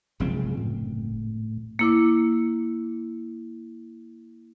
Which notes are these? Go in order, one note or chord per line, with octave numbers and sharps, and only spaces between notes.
F#1 G2 C3 F3 G#3 C4
A2
A#3 E4 D6